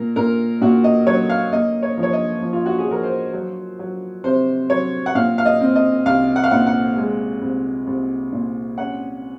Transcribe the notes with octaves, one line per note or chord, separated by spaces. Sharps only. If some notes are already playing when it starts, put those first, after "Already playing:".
Already playing: A#2 A#4
A#2 A#4
A#2 F#4
D#5
F#3 C#5
F5
A#3 D#5
C#5
F3
C#5
D#5
F3
F4
F#4
G#4
F3 A#4
C5
F#3
F#3
C3 C5
F#3 C#5
F#5
A#2 F5
F5
D#5
C4
D#5
C2 F5
F#5
F5
A#2 F#5
F#5
G#3
C2
C2
A#2
C#4 F#5